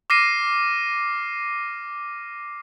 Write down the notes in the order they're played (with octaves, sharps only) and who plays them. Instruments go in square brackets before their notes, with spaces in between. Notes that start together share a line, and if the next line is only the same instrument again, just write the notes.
[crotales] D6 F6 A#6 C7 D#7